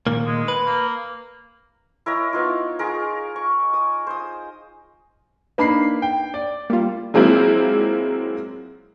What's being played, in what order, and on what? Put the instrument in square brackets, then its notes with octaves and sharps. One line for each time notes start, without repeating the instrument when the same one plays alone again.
[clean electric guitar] A#2 D#3 A#3
[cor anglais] G#3
[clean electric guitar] B4
[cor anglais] A#3
[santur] E4 A#4 C#5 D#5
B3 D#4 F4
F4 G#4 A#4
C#6
D#6
C5 D#6
[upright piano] A#3 B5 C7 [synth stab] D4 D#4 B4
[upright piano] G5
D5
[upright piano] G3 [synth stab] A#3 F4
[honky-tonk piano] F#3 G#3 A#3 C4 E4 F4